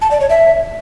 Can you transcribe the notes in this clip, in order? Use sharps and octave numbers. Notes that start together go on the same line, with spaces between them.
A5
D5
C#5
E5